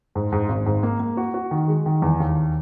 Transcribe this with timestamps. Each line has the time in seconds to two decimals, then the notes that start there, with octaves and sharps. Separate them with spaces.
0.15 G#2
0.32 G#2
0.49 G#1
0.66 G#2
0.83 A#3
1.00 A#3
1.17 F#4
1.34 F#4
1.51 D#3
1.68 G#3
1.86 D#3
2.02 E2
2.20 D#2